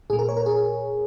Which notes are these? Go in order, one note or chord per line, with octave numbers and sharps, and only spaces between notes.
A#2 A#3 G#4
A#4
C#5
A#4
G#4